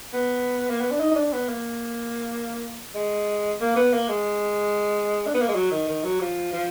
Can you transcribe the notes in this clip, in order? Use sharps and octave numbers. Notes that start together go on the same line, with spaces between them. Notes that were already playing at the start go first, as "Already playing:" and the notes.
B3
A#3
B3
D4
D#4
D#4
D4
B3
A#3
G#3
A#3
B3
A#3
G#3
D4
B3
A#3
G#3
F#3
D#3
D#3
F#3
F3
F3